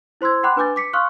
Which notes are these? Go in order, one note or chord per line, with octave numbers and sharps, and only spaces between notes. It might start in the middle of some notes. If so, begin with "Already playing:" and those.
E4 C5 C6 E6 G#6
F#5 G5 B5 C6 D6 F#6
D4 B4 G#5 D6 G6 A6
D6 B6 C#7
F5 C6 C#6 D#6 F6 F#6